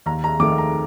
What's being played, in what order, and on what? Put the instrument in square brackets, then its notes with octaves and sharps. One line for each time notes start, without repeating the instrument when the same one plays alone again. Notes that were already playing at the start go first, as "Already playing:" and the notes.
[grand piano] D#2 A#5
A#5
D#3 D6
A3
A#5